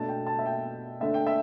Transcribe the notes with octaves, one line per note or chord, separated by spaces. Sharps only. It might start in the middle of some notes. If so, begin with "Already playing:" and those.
Already playing: B2 A3 D4 A5
G5
A5
E5
G5
D3 A3 D4 E5
G5
E5